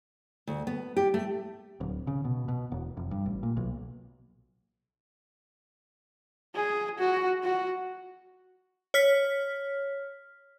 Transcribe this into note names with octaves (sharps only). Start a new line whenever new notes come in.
D2
B3
G4
A3
D1
C#3
B2
B2
E1
F1
G2
A1
A#2
B1
G#4
F#4
F#4
C#5 F6 B6